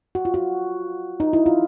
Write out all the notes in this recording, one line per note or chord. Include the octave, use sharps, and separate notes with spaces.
F#4
F4
F#4
D#4
E4
F4